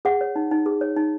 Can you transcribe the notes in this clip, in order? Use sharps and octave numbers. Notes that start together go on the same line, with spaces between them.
G#4 F#5
C#5
D#4
D#4
G#4
C#5
D#4